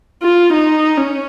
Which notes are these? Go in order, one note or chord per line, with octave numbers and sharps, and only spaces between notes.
F4
D#4
C#4